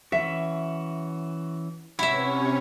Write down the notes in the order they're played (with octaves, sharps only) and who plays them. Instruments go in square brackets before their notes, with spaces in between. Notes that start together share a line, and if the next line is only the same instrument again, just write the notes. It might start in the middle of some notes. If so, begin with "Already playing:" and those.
[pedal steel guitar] E3 C#4 F#4 [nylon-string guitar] E5
[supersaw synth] C3 C#4 C#5 [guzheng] E4 E5 [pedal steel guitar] F#4